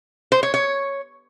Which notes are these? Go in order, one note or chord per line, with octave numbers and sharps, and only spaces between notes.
C5
C#5
C#5